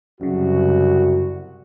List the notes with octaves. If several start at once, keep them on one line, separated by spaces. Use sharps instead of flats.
C2 F#2 C#3 F#4